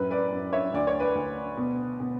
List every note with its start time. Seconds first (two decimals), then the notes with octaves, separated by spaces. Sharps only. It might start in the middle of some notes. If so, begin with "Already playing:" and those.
Already playing: F#2 A2 B4
0.11 B4 D5
0.32 F#2
0.53 C#5 E5
0.74 D2 D5
0.87 C#5
1.00 B4 D5
1.15 D2
1.57 B2
2.00 B2